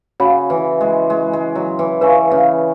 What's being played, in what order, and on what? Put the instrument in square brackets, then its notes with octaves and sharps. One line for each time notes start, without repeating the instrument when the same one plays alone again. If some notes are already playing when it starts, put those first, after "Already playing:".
[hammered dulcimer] C#3 [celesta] F#4 C#5 F#5 B5
[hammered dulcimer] E3
G#3
G#3
G#3
F#3
E3
[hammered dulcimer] C#3 [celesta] B4 G#5 C#6
[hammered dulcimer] C#3